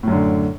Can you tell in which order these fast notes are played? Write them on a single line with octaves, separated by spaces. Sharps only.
A2 F#2 D3